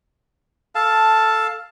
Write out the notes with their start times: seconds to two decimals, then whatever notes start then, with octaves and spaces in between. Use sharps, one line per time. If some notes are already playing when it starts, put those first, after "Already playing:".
0.75 A4 F5 A5